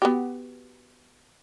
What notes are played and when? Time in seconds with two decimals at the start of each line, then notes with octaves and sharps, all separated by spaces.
0.02 B3 F#4 G4